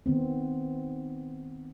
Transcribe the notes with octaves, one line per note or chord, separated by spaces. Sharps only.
D#3 B3 C4